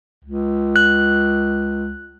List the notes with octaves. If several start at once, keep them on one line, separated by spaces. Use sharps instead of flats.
C#2
F#6